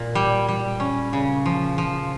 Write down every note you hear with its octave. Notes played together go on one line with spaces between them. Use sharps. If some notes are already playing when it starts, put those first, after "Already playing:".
Already playing: A#2
G3
G3
C#4
C#3
F3
F3